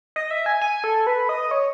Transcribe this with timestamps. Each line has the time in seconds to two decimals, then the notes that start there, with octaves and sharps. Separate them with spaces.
0.16 D#5
0.31 E5
0.46 G#5
0.61 G#5
0.84 A4
1.07 B4
1.29 D#5
1.51 C#5